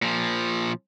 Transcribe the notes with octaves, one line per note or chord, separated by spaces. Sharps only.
A#2 F3